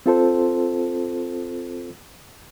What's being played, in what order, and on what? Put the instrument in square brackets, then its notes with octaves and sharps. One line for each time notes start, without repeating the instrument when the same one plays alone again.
[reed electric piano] C4 F4 A4 C5